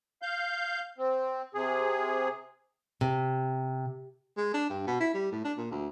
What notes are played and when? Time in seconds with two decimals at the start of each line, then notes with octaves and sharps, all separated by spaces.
0.22 F5 G6
0.98 C4
1.54 C3 G#4
3.01 C3
4.37 G#3
4.54 D4
4.70 G2
4.87 B2
5.01 E4
5.14 G3
5.32 A2
5.45 D4
5.58 A#2
5.71 D2